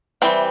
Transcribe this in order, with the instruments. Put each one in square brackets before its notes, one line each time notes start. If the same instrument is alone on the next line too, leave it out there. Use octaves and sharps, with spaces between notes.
[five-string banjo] E3 G3 C4 [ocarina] E5